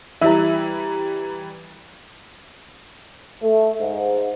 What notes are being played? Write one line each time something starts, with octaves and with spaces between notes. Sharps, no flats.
E3 G3 E4 E5 A#5
A3
G#2